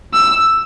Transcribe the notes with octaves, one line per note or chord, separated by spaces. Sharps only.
E6